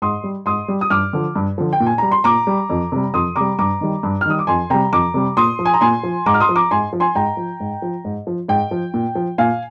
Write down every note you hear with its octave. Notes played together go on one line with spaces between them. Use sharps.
G#2 C6 D#6
G3
G#2 C6 D#6
G3
D#6
G2 D6 F6
D3 F3
G2
D3 F3
G5
A#2
G#5
G3 A#5
C6
A#2 A#5 D6
G3
F2
C3 G3
F2 C6 D#6
C3 G3 A#5 D6
G2 A#5 D6
D#3 G3
G2
F6
D#3 G3 D#6
D6
F2 G#5 C6
C3 G3 G5 A#5
F2 A#5 D6
C3 G3
A#2 C6 D#6
F3
G#5
A#5
A#2 G#5 C6
F3
G#2 A#5 D6
F6
C6 D#6
F3
A#5 D6
G#2 G#5 C6
F3
G#5 C6
G#2 G5 A#5
F3
G#2
F3
G#2
F3
G#2 G5
F3
A#2
F3
A#2 F5 G#5